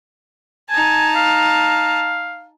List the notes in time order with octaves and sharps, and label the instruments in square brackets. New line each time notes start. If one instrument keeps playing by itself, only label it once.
[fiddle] D#4 A5 [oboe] G#5
[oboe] F5